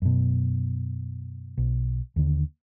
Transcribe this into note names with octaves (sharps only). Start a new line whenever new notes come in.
F#2 B2
B1
D#2 D3